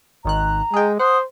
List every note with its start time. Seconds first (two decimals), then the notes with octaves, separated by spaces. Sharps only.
0.25 G#1 D#3 A#5 F#6
0.74 G#3 G#4 G5
0.99 C5 F#5 D#6